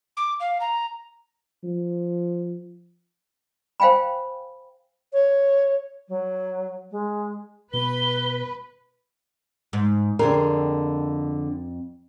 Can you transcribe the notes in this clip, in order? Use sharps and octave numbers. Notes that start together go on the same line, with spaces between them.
D6
F5
A#5
F3
C5 F5 G5 G#5 B5
C#5
F#3
G#3
B2 B4 G7
G#2
F2 D3 C4 G#4 A#4